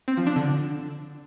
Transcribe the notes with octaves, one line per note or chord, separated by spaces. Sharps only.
C4
F3
D4
D3